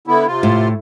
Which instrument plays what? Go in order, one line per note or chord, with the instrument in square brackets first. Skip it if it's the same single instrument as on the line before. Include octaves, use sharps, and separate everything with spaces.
[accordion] D3 B3 E4
C3 F4
[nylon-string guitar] A2